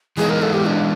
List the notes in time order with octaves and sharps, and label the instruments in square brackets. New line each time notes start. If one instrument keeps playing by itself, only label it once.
[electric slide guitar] E3 G#3 B3 D#4 [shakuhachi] G#4
[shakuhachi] A#4
A4
G4
D4